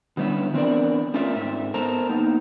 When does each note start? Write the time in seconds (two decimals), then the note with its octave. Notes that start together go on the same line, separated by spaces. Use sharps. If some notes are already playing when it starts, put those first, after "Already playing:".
0.17 D3 G3 B3 C#4 E4
0.54 E3 B3 C4 D4 A#4 D5
1.14 A3 C#4 F4 A#4 D5 E5
1.35 G#2 C4 E5
1.74 B3 A4 A#4 C5 A5 A#5
2.09 A#3 B3 D#4